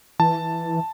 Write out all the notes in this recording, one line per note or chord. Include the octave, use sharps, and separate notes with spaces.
E3 A5